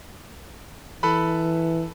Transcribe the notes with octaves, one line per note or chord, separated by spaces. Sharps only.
E3 A4 B4 B5